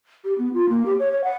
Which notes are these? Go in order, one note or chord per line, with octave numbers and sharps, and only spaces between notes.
G4
B3
F4
A#3
G4
C#5
C#5
F#5